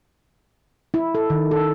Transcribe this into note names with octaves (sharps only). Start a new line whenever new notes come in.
E4
A4
D#3
A4